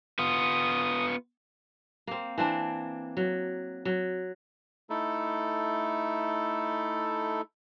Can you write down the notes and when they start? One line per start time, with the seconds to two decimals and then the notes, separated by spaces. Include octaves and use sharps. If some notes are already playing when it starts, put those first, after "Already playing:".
0.19 B3 F4 D#6
2.07 A#3 C4
2.38 E3 C4 D4
3.17 F#3
3.85 F#3
4.90 A3 D#4 E4 A4